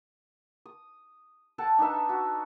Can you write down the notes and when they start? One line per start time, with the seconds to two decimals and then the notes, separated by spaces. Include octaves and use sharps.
0.66 D#6
1.58 A4 F#5 G5 A5
1.78 D4 D#4 B4 E5
2.09 F#4